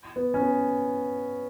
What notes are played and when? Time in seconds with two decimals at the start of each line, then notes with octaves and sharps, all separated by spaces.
0.16 B3
0.34 C#4
0.41 B3